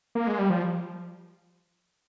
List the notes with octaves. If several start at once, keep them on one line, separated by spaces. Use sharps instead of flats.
A#3
G#3
G3
F3